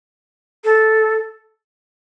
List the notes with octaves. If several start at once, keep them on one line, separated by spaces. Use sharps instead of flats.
A4